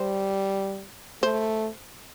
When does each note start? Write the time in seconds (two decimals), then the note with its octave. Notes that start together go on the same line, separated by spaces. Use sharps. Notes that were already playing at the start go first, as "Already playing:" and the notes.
Already playing: G3 C5
1.22 A3 C5